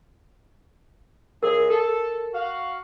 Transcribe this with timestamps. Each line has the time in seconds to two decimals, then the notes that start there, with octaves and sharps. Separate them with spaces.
1.43 C#3 G#3 G#4 A#4
1.69 A4
2.33 F#4 F5